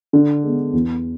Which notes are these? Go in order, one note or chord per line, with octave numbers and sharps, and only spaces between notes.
D3
G#3 B3
E2